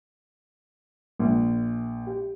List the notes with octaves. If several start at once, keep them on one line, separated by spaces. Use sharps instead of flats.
A#1
G4